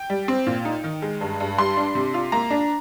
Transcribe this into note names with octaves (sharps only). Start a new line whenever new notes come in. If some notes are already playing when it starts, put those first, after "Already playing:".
Already playing: G5
G3
C4
A#2
D#4
D#3
G#3
G2
G2
G3 C6
D4
C3
F4
A#3 A#5
D4